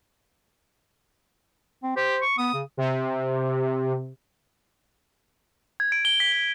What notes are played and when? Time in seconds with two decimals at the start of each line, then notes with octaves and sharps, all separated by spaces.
1.83 C4
1.97 G4 C5
2.22 C#6
2.38 B3 D#6
2.54 C#3
2.77 C3
5.80 G#6
5.92 D7
6.05 G7
6.20 B6
6.32 G7